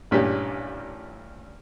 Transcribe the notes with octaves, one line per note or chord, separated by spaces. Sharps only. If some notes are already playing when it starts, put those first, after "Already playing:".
A1 G2 A#2 C#4 G4